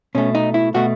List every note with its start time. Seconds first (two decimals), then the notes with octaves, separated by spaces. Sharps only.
0.15 B2 A3 C#4
0.35 D#4
0.54 E4
0.74 B2 A3 F#4